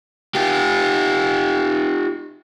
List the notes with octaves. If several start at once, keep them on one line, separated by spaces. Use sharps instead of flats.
F4 G4